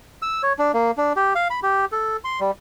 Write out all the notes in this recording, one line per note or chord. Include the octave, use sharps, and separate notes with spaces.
E6
C#5
D4
A#3
D4
G4
F5
B5
G4
A4
C6
G3